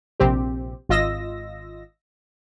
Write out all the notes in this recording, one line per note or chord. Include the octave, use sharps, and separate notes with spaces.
A#1 C3 C4 G4
G#1 F4 D#5 E6 A#6